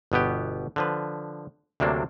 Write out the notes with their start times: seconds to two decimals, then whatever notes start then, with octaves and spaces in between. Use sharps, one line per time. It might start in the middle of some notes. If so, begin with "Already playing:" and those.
0.12 G1 B2 B3 G4
0.76 D3 F3 B4
1.80 D2 C3 F#3 A#3 D4